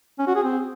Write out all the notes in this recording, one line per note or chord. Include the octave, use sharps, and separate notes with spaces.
C#4
F#4
G#4
C4